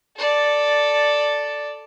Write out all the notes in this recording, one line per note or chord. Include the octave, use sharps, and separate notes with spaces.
A4 D5